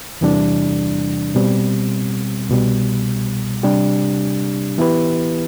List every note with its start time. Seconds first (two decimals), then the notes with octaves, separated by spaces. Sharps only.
0.21 E2 C3 E3 G3 D4
1.35 B2 G3 C4
2.49 C2 B2 G3
3.63 C3 G3 D4 G4
4.78 E3 B3 E4 G4 B4